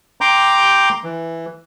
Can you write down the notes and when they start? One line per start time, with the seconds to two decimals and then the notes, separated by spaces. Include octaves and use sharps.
0.21 G5 A#5 C6 D6 G6
1.04 E3